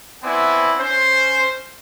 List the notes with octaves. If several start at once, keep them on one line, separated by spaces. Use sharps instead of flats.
B3 C4 E4 D5 G#5
C#4 C5